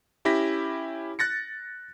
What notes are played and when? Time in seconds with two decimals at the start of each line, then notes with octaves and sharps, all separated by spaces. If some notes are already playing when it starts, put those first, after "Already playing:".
0.25 C#4 E4 G4 A#6 B6
1.19 F#6 A6 A#6 C#7